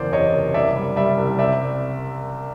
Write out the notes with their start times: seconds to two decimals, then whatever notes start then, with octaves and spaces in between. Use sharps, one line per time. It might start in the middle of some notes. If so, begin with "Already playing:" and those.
Already playing: F#1 E2 C5 D5
0.13 C3 C#5 D#5
0.33 F#1
0.54 C2 D5 E5
0.76 G3
0.96 G3 D5 E5
1.17 C2
1.39 C4 D5 E5